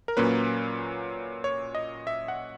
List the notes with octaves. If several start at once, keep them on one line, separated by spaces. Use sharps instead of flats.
A#4
A#2 F#3 A#3 C#4 B4
C#5
D#5
E5
F#5